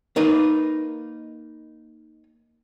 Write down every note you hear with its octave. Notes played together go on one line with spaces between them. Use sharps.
A#3 D#4 A#4 B4